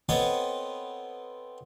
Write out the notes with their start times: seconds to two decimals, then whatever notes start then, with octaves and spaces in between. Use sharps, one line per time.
0.09 B3 C4 A4 B4 C#5 D#5